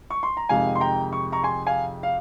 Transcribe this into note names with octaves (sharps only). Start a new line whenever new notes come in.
C#6
C6
A#5
F2 C3 D#3 G#3 F5 G#5
C6
G5 A#5
C#6
A#5 C#6
G#5 C6
F5 G#5
F5